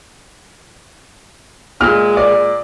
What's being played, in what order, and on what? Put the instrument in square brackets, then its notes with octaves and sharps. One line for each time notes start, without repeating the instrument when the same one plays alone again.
[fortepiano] A#2 [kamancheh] G#3 [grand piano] F6
[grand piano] D5